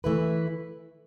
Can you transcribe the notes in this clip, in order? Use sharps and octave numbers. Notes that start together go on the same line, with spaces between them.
E3 A3 E4 B4